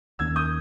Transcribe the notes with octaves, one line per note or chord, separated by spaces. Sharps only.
D#2 D#3 A#3 C#4 E6 G#6
D#6 G6